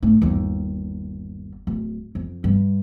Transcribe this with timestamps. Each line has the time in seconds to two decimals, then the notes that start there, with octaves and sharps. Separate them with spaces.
0.03 G#2 A3
0.22 G1 D#2
1.67 D1
2.15 F2
2.44 G2